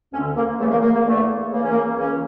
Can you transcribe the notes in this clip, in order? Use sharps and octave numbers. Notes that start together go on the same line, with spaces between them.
D2 D3 C#4
A#3
E2 C#3 E3 A3
A#3
A#3
A#3
E2 D3 A3
C#2 C#3 E3 A#3
C#4
A#3
C#2 C#3 E3 C#4